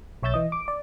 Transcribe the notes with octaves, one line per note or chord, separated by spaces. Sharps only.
B1 C#5 E5 E6 G6 A6
E3 D#5
D6
D5